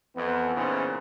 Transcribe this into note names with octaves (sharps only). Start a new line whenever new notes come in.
F2 E3 B3
A#2 C#3 E3 B3 D#4 C5